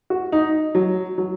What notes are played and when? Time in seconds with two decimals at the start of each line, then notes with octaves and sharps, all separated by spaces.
0.10 F#4
0.32 D#4
0.75 F#3
1.18 F#3